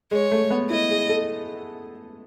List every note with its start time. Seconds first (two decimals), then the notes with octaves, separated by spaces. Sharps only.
0.11 G#3 C#5
0.32 A3
0.51 B3
0.70 E4 D#5
0.90 G#4
1.09 A4